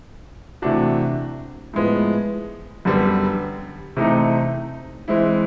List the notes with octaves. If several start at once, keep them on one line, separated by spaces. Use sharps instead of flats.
C3 E3 A3 D4 F#4
A2 F3 G#3 B3
F#2 D3 G3 B3
C3 E3 A3 C4 D#4
E3 G#3 C4 E4